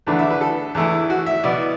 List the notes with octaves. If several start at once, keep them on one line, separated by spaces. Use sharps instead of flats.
E2 D3 A3 D4 B4
E5
B4
A4
E2 E3 A3 E4
F#4
E5
B2 B3 E4 D5